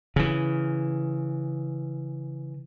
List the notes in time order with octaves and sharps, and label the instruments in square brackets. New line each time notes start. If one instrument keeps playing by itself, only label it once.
[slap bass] C#3 E3